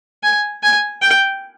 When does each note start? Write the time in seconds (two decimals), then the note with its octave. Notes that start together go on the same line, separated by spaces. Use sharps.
0.23 G#5
0.63 G#5
1.02 G5